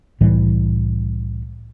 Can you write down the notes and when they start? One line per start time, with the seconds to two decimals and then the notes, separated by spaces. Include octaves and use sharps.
0.21 C2 A2 E3 G3